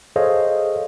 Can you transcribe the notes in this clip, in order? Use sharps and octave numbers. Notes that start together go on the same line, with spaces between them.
G#4 A4 C5 C#5 D#5 F5